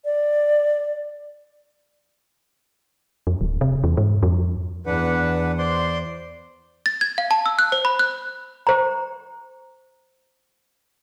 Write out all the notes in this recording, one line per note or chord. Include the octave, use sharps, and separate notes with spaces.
D5
F2
D1
C3
E2
G#2
F2
E2 D4 B4 F#5
C5 D5 C6
A6
G#6
F5
A5
E6
F#6
C5
B5
F#6
C5 A#5